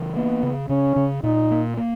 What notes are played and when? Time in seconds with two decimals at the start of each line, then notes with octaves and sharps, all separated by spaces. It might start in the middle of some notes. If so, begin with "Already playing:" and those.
Already playing: C#3 E3
0.16 A#3 B3
0.43 C#3
0.69 C#3 C#4
0.96 C#3
1.23 A#2 D#4
1.51 A#3
1.77 A#3